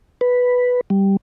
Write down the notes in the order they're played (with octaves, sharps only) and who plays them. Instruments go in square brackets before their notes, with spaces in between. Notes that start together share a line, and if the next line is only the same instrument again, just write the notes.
[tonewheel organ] B4
G3